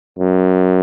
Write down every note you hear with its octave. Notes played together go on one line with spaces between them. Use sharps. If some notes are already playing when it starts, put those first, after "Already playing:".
F#2